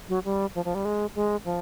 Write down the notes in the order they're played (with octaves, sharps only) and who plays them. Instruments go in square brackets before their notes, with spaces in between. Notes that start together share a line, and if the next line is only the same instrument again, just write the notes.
[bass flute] F#3
G3
F3
F3
G3
G#3
G#3
F3